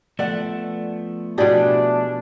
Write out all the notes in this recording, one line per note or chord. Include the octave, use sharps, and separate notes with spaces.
F3 A3 B3 D5 F#5
B2 D4 E4 G4 G#4 D5